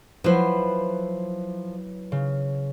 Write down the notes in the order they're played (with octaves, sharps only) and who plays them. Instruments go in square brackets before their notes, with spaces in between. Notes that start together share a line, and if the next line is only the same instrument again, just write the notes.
[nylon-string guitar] F3 C5 [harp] F#3 E4 B4
[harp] C#3